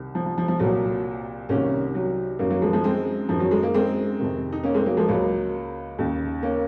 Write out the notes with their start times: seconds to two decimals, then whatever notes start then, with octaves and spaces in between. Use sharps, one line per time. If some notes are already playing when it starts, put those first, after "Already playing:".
Already playing: C2 C3 D#3
0.15 F3
0.26 F3
0.38 F3
0.48 F3
0.59 C2 A#2 F#3
1.49 C2 C3 D#3 A#3 C#4
1.95 F#3
2.39 F#2 D#3 F#3 A#3
2.50 F#3 A#3
2.62 F3 G#3
2.73 F3 G#3
2.84 G#3 C4
3.29 F#2 D#3 F3
3.40 F#3
3.51 G#3
3.63 A#3
3.74 G#3 C4
4.19 F2 C3 D#3
4.53 D#4
4.64 A#3 C#4
4.74 G#3 C4
4.86 F#3 A#3
4.97 F3 G#3
5.09 C#2 C#3 F#3 A#3
5.99 D#2 C#3
6.43 A#3 C#4